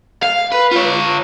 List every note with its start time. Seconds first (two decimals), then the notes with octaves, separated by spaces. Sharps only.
0.23 F5
0.52 B4
0.72 F4 C#5